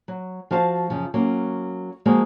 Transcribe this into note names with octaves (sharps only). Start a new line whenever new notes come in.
F#3
F3 F#4 F5 A5
F#2 C#3 F3
F#3 A#3 C#4
F3 G#3 A#3 F#4